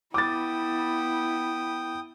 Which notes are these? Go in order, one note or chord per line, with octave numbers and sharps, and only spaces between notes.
B3 E4 G5 D6 D#6 A6